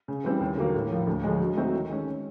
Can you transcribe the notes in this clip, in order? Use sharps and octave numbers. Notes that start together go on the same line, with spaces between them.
C#3
E3 G3 C4
D#2
D3 F#3 A#3
A2
F3 A#3
D2
D3 F3 G#3
F#3
A3 C4 D#4 F#4
D#3
G#3 C#4